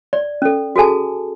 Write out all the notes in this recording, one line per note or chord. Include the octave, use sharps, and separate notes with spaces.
D5
C#4 A4
F#4 G#4 A4 G#5 A5